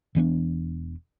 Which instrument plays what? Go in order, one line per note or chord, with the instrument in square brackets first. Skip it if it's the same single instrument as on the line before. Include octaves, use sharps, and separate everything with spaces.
[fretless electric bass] E1 E3 B3 D4